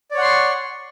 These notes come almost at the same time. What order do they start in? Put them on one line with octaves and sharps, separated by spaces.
D5 C#5 F#5 C6 C#6